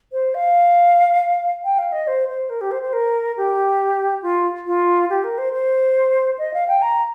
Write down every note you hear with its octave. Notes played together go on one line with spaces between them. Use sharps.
C5
F5
G5
F5
D#5
C5
C5
A#4
G4
C5
C5
A#4
G4
F4
F4
G4
A#4
C5
C5
D#5
F5
G5
A#5